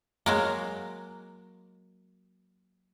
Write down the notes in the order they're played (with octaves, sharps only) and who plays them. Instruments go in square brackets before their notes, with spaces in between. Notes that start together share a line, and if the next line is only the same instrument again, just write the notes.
[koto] F#3 G#3 A#3